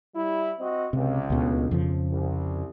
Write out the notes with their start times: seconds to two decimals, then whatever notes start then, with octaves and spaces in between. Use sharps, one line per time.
0.15 G3 E4
0.59 C4 F#4 D#5
0.93 C#2 C3
1.30 D2 B2 D3
1.71 F2 C#3 F3
2.10 C2